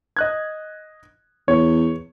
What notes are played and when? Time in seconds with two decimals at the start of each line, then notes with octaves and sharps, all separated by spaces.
0.17 D#5 F#6 G#6
1.48 E2 C#5